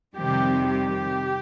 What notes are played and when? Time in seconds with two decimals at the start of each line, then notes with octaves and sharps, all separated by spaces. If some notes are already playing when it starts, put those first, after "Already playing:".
0.16 F2 C3 D#3 G3 G4
0.70 G4